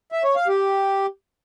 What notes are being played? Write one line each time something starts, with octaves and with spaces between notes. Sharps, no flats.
E5
C#5
F5
G4